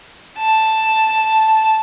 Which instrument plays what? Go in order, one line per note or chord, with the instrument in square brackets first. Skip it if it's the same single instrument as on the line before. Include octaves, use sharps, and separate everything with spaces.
[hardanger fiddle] A5